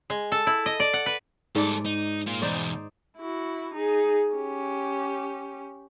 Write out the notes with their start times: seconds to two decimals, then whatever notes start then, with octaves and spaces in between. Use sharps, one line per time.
0.10 G#3
0.32 A4
0.47 E4
0.66 D#5
0.80 D5
0.93 F#5
1.06 B4
1.55 G#2 G3 A4 D5
1.86 D#4
2.27 A#3 F4
2.42 E2 B2 D#4 C5 D5
3.18 E4 F#4
3.75 D#4 G#4
4.35 C#4 G4